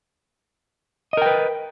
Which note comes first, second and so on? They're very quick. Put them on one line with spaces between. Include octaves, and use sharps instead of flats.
D#5 A#4 G5 B4